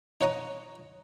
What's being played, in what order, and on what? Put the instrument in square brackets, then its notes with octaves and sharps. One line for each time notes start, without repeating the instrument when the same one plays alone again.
[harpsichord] D#4 C#5 F#5 A#5 D#6